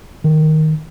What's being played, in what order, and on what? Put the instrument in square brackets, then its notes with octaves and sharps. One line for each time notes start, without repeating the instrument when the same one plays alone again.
[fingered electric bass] D#3